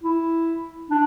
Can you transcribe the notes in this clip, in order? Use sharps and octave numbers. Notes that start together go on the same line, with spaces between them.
E4
D4